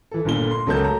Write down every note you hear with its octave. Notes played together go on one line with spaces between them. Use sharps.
E3 A4
G1 A#2 D3 G7
C6
C#2 F#3 A4 A#4 A5 G6
A3 A#5